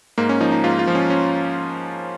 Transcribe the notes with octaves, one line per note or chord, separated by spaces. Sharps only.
G#2 A#3
C#4
F3 D#4
D#4
G#2 F4
F4
F3
C#4
C#4